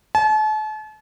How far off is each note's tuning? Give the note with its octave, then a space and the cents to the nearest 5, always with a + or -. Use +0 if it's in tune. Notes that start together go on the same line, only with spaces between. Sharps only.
A5 -40